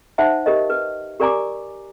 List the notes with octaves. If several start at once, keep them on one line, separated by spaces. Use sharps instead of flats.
D#4 C5 E5 F#5 A5
G4 A#4 D#5
B4
G4 A#4 D5 G#5 A#5 D6